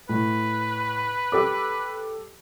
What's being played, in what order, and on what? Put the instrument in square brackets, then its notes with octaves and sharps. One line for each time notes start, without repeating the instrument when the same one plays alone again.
[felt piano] A2 [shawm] B4
[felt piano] G4 A4 D6